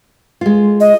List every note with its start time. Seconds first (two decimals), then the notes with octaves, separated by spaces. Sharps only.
0.41 G#3 F4
0.80 D#5